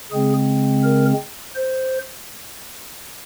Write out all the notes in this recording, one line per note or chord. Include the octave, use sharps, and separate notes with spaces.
C#3 G#3 C4 G#4
A#4
C5